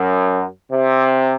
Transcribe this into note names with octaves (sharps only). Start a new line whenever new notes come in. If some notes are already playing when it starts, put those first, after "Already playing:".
Already playing: F#2
C3